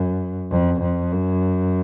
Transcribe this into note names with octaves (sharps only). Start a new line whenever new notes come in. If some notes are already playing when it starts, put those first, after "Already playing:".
Already playing: F#2
F2
F2
F#2